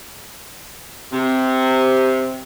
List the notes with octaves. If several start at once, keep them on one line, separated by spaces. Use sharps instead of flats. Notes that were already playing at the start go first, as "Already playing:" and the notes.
C3